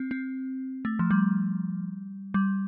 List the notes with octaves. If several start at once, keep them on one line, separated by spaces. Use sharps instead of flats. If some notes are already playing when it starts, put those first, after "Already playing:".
Already playing: C4
C4
A3
F3
G3
G3